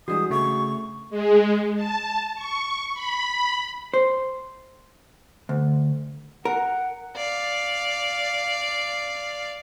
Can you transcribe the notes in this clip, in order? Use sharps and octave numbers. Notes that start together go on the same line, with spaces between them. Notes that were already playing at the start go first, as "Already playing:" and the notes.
E3 G3 G#3 D4 F#4 D#6
C#3 A3 C#6
G#3
A5
C#6
B5
C5
D2
A#4 F#5
D5 F5